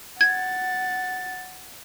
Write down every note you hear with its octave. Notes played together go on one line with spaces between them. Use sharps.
F#5 G#6 A6